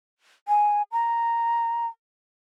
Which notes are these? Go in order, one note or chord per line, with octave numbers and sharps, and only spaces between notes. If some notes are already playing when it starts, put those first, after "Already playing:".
G#5
A#5